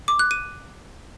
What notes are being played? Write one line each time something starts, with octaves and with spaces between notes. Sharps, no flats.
D6
F#6
D#7